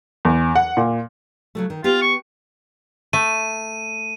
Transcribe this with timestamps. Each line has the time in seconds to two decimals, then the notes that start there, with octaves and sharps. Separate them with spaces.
0.25 E2
0.56 F#5
0.77 A#2
1.55 C#3 F#3 A3
1.70 D#3
1.84 B3 F4 G4
2.02 C#6
3.13 A3 D#7